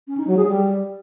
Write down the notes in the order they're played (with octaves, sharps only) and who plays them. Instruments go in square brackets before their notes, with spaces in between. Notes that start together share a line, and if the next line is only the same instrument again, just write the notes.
[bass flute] C#4
D#4
F#3
G#4
G3